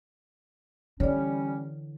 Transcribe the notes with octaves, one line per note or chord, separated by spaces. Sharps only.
D3 E3 G3 C#4 C#5 D5